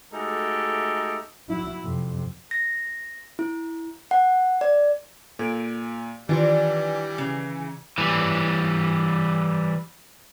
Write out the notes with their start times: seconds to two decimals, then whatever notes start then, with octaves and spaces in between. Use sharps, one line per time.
0.14 G#3 A3 D#4 F#4 G4 A4
1.49 F#3 E4
1.82 F2 C3
2.51 A#6
3.39 E4
4.11 F#5
4.61 D5
5.39 A#2 A4 G#6 D7
6.29 D#3 E3 G3 D4 F4 C6
7.18 C#3
7.98 E3 G3